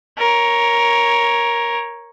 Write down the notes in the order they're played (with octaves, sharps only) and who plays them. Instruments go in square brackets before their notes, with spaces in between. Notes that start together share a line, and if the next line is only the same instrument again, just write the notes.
[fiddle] A#4 C#5